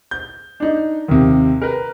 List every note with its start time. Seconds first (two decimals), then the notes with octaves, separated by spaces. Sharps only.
0.11 G6
0.60 D4 D#4
1.08 D#2 C3
1.62 A#4 B4